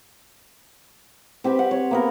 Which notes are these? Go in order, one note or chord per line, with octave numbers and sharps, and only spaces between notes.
C4 G4 B4 B5
F#5
C#5
A#3 B3 A#4